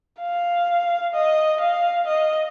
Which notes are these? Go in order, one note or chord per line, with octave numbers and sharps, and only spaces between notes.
F5
D#5
F5
D#5